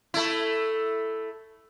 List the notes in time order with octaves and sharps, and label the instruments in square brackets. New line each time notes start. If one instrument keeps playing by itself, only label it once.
[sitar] A3 E4